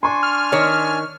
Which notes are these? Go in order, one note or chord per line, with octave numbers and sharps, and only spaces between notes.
D4 G#5 C6 C#6
F6
D#3 C#5